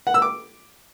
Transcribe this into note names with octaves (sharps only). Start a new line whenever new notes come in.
F#5
E6
D6